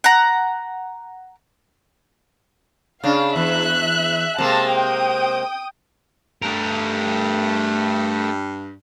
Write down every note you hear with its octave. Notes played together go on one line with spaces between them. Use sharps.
F#5 A#5
C#3 D4 F5
E2 E5 F#6
C3 G#3 A#3 A5
G5 D#6
G2 A3 A#4